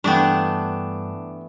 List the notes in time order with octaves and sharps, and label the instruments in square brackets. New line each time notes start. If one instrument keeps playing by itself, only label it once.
[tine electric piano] G2 [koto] E3 A3 B3 [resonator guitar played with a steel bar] D4 [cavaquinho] G5 C#6